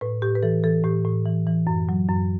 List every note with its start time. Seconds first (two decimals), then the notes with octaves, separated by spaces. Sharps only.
0.01 A2 B4
0.22 A2 G4
0.35 B4
0.43 E3 A4
0.64 E3 A4
0.84 A2 G4
1.05 A2
1.26 E3
1.47 E3
1.67 F#2
1.89 F#3
2.09 F#2